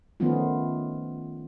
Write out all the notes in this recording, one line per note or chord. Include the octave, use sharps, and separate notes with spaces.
D#3 F3 A3 B3 C#4 F4